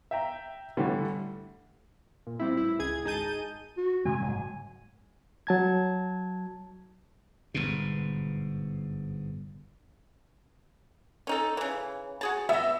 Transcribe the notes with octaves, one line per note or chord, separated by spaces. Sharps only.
E5 G5 A#5
A2 D3 E3 G3 A3
A#2
G3 C4 E4
A1 E4
C#2 G#4 G#6
G#1 D#4 G#4 A5 G6 D#7
F#4
C3 G#3 A3 G#5
F#1 G#2 F#3
F#3 A5 G#6
G1 G#2 B2
C#4 D#4 A4
C#3 E3
F#4 G#4 A5
B3 D#5 E5